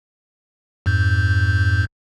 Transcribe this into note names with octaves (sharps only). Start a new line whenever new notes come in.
F2 G#2 G6